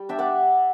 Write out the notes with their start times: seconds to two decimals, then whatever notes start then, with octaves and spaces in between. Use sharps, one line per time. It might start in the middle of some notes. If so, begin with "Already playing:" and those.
Already playing: G3
0.09 D4 E5 G5
0.19 D5 F#5